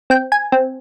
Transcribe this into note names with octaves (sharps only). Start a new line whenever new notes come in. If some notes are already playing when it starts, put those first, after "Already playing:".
C4 G5
G#5
C4